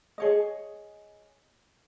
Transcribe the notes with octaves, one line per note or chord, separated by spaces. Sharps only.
G#4 C#5 D#5